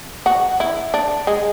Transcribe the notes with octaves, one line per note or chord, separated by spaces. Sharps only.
F#4
E4
D4
G#3